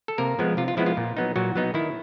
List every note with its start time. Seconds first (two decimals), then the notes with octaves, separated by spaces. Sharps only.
0.08 A4
0.18 C3 A#3 A#4
0.39 F3 G#3 B3
0.57 C3 F4
0.68 F4
0.77 F3 G#3 B3 E4
0.86 F4
0.97 A#2
1.17 F#3 B3 D#4
1.36 A#2 F#3 F#4
1.56 F#3 B3 D#4
1.74 D#3 E4